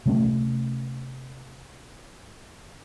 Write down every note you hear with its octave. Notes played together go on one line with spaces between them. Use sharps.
C3 A3 C#4